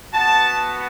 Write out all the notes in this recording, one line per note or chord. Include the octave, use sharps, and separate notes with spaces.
B3 F#4 A5